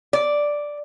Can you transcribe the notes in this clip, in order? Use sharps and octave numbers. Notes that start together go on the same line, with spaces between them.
D5